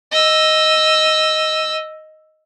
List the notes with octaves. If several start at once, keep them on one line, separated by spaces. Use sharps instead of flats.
D#5 E6